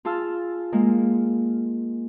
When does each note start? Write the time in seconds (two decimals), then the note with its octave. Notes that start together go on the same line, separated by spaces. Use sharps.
0.05 F4 G#4 A5 E6 F6
0.73 G#3 A#3